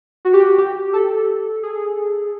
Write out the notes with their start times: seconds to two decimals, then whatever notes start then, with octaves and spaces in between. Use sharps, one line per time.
0.25 F#4
0.33 G4
0.43 F#4
0.58 G4
0.93 A4
1.63 G#4